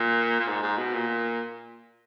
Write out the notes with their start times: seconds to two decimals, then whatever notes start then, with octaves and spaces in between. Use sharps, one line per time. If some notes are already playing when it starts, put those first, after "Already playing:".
Already playing: A#2
0.40 A#2
0.48 G#2
0.63 G#2
0.78 B2
0.93 A#2